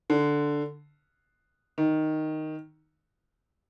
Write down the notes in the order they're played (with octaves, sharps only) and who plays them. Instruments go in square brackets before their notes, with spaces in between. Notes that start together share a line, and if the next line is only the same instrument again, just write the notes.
[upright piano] D3
D#3